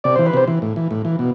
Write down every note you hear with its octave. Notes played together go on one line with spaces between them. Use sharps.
C3 D5
E3 C5
B4
C3 C5
E3
A2
E3
A2
E3
B2